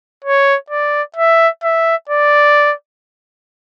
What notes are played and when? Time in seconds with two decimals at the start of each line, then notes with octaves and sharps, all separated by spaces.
0.24 C#5
0.70 D5
1.16 E5
1.63 E5
2.09 D5